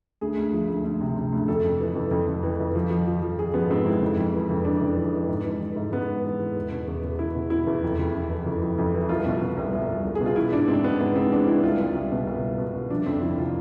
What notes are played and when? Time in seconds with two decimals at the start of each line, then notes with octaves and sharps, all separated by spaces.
0.21 D2 G#4
0.37 D2
0.53 F3
0.68 D2
0.84 D2
1.01 C3
1.16 C3
1.32 D2
1.48 F2 A4
1.64 F2
1.80 E3
1.95 F2
2.11 F2
2.27 F2
2.43 E3
2.59 F2
2.75 F3
2.91 F3
3.07 F3
3.22 F3
3.39 F3 G#4
3.54 F3 B3
3.70 G#2 C4
3.85 G#2 E4
4.01 F2
4.18 F2
4.34 E3
4.50 F2
4.65 E3 D4
4.81 F2
4.97 E3
5.13 E3
5.28 G#2
5.45 E3
5.61 E3
5.76 G#2
5.92 G#2 B3
6.08 E3
6.25 E3
6.39 E3
6.55 E2
6.71 B2
6.87 E2
7.04 E2
7.19 E2 E4
7.35 B2
7.50 B2 E4
7.67 E2
7.83 F2
7.99 F2
8.14 F2
8.30 E3
8.46 F2
8.61 F2
8.78 F2
8.94 E3
9.09 C2 F4
9.26 B2
9.42 B2
9.57 C2
9.73 C2
9.89 C2
10.05 C2
10.15 G#4
10.20 B2
10.26 F4
10.36 E3 E4
10.52 G#2 D4
10.68 G#2 C4
10.83 E3 B3
11.00 G#2 B3
11.16 G#2 C4
11.32 E3 D4
11.47 E3 E4
11.63 C2 F4
11.80 C2
11.95 C2
12.11 B2
12.27 C2
12.43 B2
12.58 B2
12.75 C2
12.90 F3 D4
13.06 F2 C4
13.22 F2 E4
13.38 C3 F4